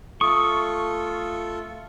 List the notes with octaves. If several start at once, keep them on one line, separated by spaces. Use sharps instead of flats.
A3 F4 A4 C#6 D#6